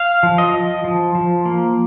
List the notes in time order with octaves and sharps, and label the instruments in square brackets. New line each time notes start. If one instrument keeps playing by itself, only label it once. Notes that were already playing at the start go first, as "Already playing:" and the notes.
Already playing: [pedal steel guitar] F5
F3
D#5
F3
F3
F3
A#3